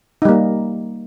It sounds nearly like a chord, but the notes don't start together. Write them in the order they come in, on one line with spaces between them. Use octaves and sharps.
D#4 G3 A#3